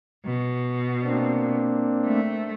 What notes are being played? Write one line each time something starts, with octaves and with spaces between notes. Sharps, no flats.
B2
A#3 C4 D4
A3